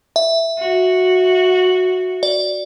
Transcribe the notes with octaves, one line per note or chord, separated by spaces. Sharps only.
E5
F#4
D5